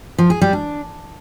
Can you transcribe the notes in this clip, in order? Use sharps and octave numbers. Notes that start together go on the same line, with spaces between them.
F3
G#4
G3
D4